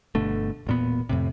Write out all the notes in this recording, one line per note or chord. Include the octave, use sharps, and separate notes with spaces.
G1 B2 D3 A3
E1 A#2 B3
F2 A2 C3